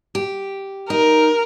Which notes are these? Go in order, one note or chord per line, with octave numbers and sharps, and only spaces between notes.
G4
D#4 A#4